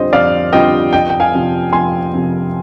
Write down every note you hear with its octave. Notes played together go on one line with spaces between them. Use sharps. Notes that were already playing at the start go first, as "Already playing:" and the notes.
Already playing: F2 D3 G3 C4 F4 C5 D#5
F2 D5 F5
D3 G3 C4 F4 D#5 G5
F2 D#5 G5
G5
F5 G#5
C3 F3 C4
F2 G#5 C6
C3 F3 C4